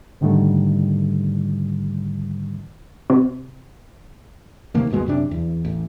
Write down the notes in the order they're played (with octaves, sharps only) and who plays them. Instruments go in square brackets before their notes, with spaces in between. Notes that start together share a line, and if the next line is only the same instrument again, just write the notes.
[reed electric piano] G#2 D3 D#3 G3 A3
[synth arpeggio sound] C3
[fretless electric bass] C3 D#3 A3 A#3
G1 D#2 B2 G#3
F#2 C3 D4
E2
A1